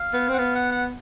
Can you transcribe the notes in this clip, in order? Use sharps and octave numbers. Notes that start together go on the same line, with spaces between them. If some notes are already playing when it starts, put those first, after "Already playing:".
Already playing: F5
B3
C4 F#5
B3 F5
F#5
F#5